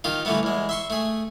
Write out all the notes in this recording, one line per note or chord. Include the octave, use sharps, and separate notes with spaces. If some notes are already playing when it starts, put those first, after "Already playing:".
D#3 F4 G4
D3 E3 G3 A3 B3
E2 G#3
E5 C6 C#6
A3 G#4